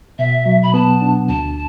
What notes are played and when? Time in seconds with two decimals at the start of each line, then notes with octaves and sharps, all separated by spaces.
0.19 B2 E5
0.46 F#3
0.63 B5
0.74 B3 A5
1.01 D4
1.29 D2 A5